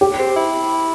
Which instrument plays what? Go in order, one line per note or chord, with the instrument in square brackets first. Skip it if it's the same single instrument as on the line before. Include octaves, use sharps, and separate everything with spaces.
[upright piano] G4
[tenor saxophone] C4
E4